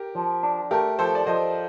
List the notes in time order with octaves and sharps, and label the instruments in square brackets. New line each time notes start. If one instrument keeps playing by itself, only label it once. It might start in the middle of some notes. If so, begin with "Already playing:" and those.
Already playing: [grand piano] G4 A#4
[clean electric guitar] F3
D4
[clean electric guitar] A3 [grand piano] G4 A#4
[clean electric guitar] F3 [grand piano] A4 C5
[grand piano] D5
[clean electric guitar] F3 [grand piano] C5 D#5